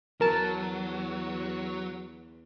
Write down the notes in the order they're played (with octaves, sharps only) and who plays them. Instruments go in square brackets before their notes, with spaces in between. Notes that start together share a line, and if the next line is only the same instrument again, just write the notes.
[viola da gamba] E2 [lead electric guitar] F#3 [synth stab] A#4 A5